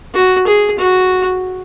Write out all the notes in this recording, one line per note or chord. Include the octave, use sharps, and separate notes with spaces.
F#4
G#4
F#4